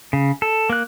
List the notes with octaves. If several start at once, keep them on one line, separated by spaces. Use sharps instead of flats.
C#3
A4
A#3 F#6